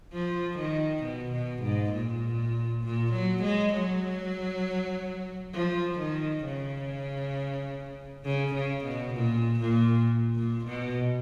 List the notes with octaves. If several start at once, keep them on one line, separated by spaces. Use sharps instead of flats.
F3
D#3
B2
B2
G#2
A#2
A#2
F#3
G#3
F#3
F3
D#3
C#3
C#3
C#3
B2
A#2
A#2
A#2
B2